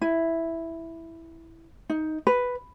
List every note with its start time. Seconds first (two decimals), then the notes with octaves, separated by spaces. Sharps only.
0.01 E4
1.90 D#4
2.27 B4